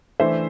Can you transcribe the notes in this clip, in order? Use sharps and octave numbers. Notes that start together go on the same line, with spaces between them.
E3 A3 D4 C5 E5